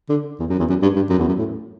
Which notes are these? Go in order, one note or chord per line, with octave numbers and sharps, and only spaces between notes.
D3
E2
F#2
E2
F#2
G2
G2
F#2
E2
F#2
A2